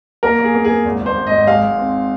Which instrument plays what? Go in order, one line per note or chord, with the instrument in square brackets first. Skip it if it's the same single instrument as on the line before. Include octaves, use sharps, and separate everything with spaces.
[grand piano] A#3 A#4
A#3
G#4
A#3
G#4
A#3
G#1
G#1 C5
G#2
D#5
G#1
G#3 F5
G#2
C4